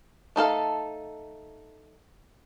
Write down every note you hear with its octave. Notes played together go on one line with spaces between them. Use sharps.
A3 D#4 A4 F5